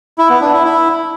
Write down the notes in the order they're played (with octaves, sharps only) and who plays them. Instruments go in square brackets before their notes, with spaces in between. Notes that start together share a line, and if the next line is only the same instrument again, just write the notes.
[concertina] E4
B3
D4
E4
E4